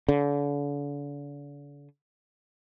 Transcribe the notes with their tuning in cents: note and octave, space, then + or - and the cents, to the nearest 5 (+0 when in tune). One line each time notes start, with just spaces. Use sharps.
D3 -40